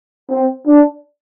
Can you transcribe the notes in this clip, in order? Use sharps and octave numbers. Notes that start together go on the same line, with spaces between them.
C4
D4